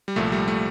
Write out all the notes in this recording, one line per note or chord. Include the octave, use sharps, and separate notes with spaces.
G3
C2 A#2 F3 A3
G3
A3